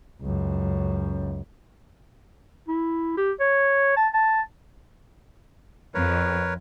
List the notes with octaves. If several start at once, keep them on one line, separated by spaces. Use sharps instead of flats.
C#2 F#2
E4
G4
C#5
A5
A5
F2 A#4 B4 C#5